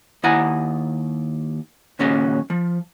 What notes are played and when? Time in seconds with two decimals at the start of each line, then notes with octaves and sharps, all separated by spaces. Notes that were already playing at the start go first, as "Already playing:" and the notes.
0.24 D#2 E4 D#5 F#5 G#5 A#5
1.99 D#2 A#2 C#3 F#3 C#4 D#5
2.50 F3